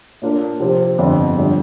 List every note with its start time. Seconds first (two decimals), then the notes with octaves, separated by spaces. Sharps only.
0.22 A#2 A#3 D4 F4 A#4
0.60 C3 F3 C4 G4
0.98 G1 F2 D3
1.37 G2 D3 F3